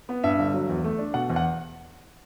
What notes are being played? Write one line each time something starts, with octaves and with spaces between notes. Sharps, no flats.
B3
G2 E5
G1
F#3
E2
A3
D4
B2 F#5
E2
F#5